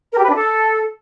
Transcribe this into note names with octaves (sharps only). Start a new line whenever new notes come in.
A#4
G4
B4
D4
A4